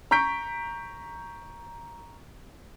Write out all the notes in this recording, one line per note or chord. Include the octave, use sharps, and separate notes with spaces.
A#5 C#6 G6 B6 D7